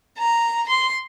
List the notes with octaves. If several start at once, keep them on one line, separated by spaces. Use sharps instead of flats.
A#5
C6